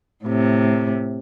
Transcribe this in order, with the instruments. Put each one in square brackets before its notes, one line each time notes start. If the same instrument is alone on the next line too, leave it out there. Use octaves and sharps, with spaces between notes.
[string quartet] A2 C3